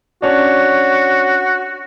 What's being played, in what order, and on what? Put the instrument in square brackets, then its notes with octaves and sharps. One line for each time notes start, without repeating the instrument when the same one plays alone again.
[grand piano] C#4 D4 [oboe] F#4